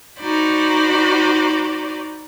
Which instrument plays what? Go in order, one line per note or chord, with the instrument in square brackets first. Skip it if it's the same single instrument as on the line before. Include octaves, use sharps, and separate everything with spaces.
[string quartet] D#4 F#4 C5 D5 B5